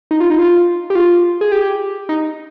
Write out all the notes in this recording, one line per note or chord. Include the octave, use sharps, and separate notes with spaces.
D#4
F4
D#4
F4
G4
F4
G#4
G4
D#4